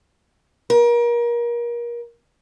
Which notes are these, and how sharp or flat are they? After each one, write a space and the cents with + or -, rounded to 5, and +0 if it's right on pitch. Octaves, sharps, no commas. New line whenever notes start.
A#4 +30